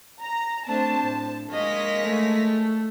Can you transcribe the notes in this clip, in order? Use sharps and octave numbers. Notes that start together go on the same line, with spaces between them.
A#5
A3 C4 D4 C5 A5
A2
G#3 A#3 G#4 C#5 D#5 F5 A#6 B6
A3